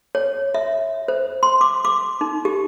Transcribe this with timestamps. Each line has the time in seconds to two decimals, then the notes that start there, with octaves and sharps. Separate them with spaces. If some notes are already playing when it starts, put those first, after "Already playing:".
0.15 C#5
0.54 E5
1.08 C5
1.43 C6
1.61 D6
1.85 D6
2.21 D#4
2.45 G4